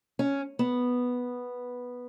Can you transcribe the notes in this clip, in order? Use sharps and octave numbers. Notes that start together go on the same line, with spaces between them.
C#4
B3